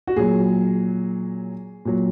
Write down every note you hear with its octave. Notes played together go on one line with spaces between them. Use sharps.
F#4
A#2 F#3 G#4
A#2 F#3